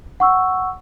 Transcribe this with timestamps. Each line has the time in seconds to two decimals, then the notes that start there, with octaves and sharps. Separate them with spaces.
0.20 F#5 C#6 E6